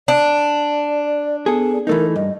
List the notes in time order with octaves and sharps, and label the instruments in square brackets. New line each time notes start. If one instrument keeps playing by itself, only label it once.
[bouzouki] D4 [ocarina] D5
[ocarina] B3 [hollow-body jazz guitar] G#4 A4
[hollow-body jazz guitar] E3 A3 D#4 [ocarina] A#4
[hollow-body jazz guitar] G2 [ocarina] D#5